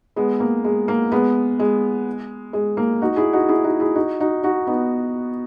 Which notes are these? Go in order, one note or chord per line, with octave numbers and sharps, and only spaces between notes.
G#3 B3
A#3
G#3
A#3
G#3 B3
G#3
G#3
A#3
D#4 F#4
E4 G#4
D#4 F#4
E4 G#4
D#4 F#4
E4 G#4
D#4 F#4
D#4 F#4
D#4 F#4
B3 D#4